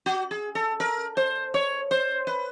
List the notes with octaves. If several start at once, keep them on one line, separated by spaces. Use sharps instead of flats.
F#4
G#4
A4
A#4
C5
C#5
C5
B4